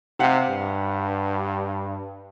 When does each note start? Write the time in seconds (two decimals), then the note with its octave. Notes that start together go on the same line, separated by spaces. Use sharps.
0.19 C3 G4 F5 F#5
0.49 G2